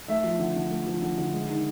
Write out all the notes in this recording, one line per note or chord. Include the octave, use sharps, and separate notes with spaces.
A3 E5
F3
D3
D3
A3
F3
D3
D3
G#3
D#3